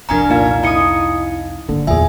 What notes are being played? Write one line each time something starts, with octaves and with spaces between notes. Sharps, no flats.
C2 F2 C#4 D4 F4 A#4 G#5 A#5
A#2 D#4 F5 G#6
E4 D#5 G#5 D#6 C#7
G2 D3 A#3
E2 A#2 E3 G#4 E5 G#5